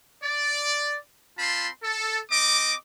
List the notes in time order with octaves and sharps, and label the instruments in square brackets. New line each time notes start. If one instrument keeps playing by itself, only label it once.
[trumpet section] D5
C4 F4 A5 B5 C6
A4
C4 D#5 D6